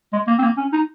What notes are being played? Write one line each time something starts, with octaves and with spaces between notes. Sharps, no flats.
G#3
A#3
C4
A#3
C#4
D#4